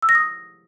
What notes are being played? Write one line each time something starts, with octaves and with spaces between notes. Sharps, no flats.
E6
A#6
D#6